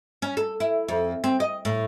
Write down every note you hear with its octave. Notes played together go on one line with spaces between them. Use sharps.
C#4
A4
E4
F2
C4
D#5
A2